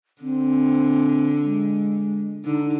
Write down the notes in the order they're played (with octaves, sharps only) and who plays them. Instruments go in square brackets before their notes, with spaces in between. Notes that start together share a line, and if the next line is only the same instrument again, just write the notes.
[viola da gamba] D3 [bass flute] C4
[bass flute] G#3
[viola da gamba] D3 [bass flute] D#4